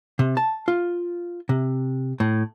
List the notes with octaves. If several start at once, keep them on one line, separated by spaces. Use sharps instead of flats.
C3
A5
F4
C3
A2